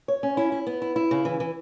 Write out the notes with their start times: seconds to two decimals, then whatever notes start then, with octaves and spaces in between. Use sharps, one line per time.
0.08 C#5
0.23 C#4
0.37 E4
0.52 E4
0.67 B3
0.82 E4
0.96 E4
1.11 C#3
1.25 E3
1.40 E3